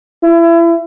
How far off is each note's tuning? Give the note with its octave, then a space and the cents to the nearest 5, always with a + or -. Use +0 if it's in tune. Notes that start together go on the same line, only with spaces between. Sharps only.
E4 +30